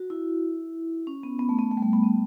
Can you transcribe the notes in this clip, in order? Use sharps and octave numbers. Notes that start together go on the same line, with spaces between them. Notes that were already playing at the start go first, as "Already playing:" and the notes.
Already playing: F#4
E4
C#4
B3
B3
A3
B3
A3
G3
A3
B3
B3